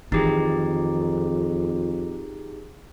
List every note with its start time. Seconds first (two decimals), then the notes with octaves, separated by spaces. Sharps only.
0.12 F2 D#3 E3 D#4 G4 G#4